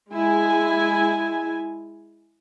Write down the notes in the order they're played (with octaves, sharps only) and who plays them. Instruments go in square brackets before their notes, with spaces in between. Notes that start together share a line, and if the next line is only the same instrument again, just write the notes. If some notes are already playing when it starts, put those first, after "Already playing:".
[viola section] G#3 E4 G#5